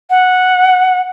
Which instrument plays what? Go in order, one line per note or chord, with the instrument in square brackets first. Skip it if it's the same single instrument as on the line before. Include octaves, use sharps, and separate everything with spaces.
[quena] F#5